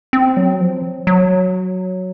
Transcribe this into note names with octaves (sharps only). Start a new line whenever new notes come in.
C4
F#3
F3
F#3